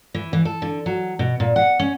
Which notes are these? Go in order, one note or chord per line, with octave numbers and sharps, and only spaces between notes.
E3
E3
A4
D3
F#3
B2
A#2
F#5
C#4